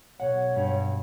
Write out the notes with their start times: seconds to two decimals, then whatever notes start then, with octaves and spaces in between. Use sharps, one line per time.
0.20 B1 C#5 F#5
0.54 G2